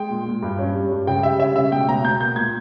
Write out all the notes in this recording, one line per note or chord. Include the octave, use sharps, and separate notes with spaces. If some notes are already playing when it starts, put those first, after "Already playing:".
Already playing: G#3 G5
A#2
A#2
G2
C#4
G3
G2
C#3 G5
G3 E5
C#4 E5
C#3 E5
B2 G5
B2 A#5
B2 G6
A#3 G6
A#2 G#6